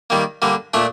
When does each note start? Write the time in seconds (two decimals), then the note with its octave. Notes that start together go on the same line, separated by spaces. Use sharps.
0.10 D#3 G3 A#3
0.42 D3 G3 A#3
0.74 A#2 A3 D4